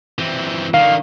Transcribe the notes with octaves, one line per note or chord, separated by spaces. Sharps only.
E3 C4
D3 D#3 F5